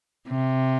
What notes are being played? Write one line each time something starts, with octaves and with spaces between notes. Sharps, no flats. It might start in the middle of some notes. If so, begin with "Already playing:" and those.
C3